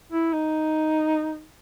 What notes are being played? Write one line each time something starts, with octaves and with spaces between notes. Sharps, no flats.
E4
D#4